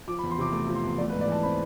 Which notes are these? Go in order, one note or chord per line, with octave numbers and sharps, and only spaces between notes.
F3 D6
B5
E2
C6
C3 D6
A3 D6
F3
C6
E2
A3 D5
B4
G#2
D5
E3 A5
C4 B5